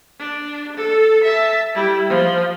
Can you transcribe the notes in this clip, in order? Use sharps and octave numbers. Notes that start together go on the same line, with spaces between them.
D4
A4
E5 A5
G3 E4
F3